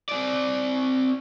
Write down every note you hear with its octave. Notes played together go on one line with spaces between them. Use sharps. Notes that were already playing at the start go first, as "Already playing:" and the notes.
C4 D5